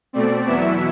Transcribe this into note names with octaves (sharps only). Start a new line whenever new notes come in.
B2 A3 C4 D5
E2 B2 F#3 B3 E4 E5